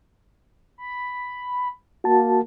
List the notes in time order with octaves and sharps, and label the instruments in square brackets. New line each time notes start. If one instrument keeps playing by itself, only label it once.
[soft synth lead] B5
[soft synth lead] A#3 [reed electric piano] F#4 A5